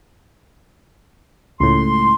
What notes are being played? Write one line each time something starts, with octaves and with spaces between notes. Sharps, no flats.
C#2 A2 C6